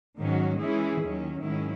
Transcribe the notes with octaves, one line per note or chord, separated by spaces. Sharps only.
G#2 D#3 F#3 C#4 F#4
E3 G#3 C#4 E4 G#4
D#2 D#3 F#3 C#4
G#2 D#3 F#3 C#4 E4